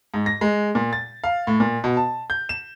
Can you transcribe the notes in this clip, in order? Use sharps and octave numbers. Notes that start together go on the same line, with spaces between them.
G#2
A#6
G#3
A#2
A6
F5
A2
A#2
B2
A5
G6
E7